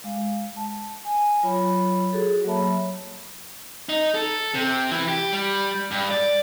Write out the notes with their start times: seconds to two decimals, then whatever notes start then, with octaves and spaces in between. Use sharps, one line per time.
0.04 G#3 F5
0.56 A5
1.05 G#5
1.43 F#3 F4 C#5 B5
2.13 F#4 G#4 A4
2.45 F#3 A#3 C#5 E5 A5 B5
3.89 D#4
4.15 A4
4.54 C3
4.91 E3
5.08 G4
5.33 G3
5.91 G2
6.11 D5